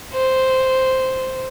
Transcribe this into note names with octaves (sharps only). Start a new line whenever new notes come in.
C5